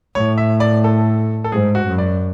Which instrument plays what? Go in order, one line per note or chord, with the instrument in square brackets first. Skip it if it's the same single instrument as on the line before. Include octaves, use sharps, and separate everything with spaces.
[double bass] A2 [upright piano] C#5
[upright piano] E5
D5
A4
A4
[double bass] G#2 [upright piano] G#4
[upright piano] F#4
[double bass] F#2
[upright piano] D5